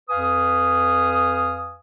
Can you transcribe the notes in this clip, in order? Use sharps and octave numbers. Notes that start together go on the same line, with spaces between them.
F2 B4 F5 G#5 D#6